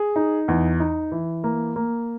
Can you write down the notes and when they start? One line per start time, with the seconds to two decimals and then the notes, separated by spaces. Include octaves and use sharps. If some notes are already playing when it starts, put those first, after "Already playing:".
Already playing: G#4
0.16 D#4
0.48 E2
0.80 D#4
1.12 E3
1.44 A#3
1.76 A#3